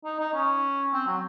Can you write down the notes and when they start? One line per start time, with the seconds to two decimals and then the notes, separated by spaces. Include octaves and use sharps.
0.04 D#4
0.20 D#4
0.33 C#4
0.93 C4
1.07 F#3